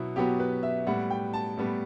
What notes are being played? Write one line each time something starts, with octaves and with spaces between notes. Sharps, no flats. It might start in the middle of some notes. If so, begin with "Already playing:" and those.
Already playing: B2 F#3 B3 E4
B2 F#3 B3 G4
B4
E5
A2 G3 B3 F#5
G5
A5
A2 G3 B3